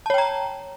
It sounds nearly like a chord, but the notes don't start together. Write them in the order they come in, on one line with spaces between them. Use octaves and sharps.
A5 C#5 G5 A#5